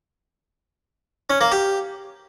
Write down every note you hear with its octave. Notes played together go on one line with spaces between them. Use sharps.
C#4
A#3
G4